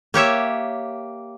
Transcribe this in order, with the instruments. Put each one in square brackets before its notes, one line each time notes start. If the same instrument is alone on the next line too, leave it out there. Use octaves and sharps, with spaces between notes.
[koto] A#3 G4 C#5 E5